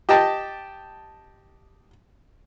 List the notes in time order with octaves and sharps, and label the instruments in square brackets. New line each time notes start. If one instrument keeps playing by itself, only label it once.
[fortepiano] G4 D#5 G5 A5